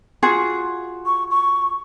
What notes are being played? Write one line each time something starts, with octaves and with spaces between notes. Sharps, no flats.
F4 F#4 G#4
C#6
C#6